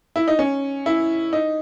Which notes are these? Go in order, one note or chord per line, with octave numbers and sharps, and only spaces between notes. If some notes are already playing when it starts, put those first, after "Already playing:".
E4
D#4
C#4
E4
D#4